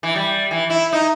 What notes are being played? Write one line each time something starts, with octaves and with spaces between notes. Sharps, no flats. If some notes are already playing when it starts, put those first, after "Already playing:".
E3
G3
E3
E4
D#4